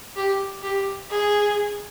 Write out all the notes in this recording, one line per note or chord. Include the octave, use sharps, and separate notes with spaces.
G4
G4
G#4